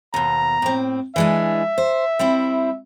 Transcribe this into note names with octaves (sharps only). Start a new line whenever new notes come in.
D#2 B2 A#5
A2 C4
E3 G#3 D4 E5
C5
G3 C4 E4